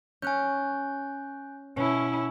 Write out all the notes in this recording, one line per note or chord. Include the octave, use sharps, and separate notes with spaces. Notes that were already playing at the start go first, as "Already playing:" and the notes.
C#4 G#5 F#6 G6
B2 C#4 E4